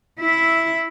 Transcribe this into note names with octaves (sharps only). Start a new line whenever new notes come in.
E4 E5